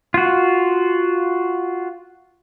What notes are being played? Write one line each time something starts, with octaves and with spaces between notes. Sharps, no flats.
F4 F#4